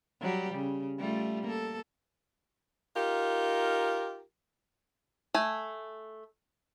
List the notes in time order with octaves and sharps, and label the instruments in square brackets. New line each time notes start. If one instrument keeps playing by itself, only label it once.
[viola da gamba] F#3 G3 G4
C#3
G3 A3 F4
A#3 A4
[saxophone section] D#4 F4 G4 A#4
[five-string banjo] A3 G#5